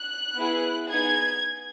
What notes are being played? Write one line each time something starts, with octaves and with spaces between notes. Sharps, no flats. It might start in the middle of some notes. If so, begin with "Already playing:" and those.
Already playing: F#6
B3 E4 G#4
B3 D#4 G#4 G#6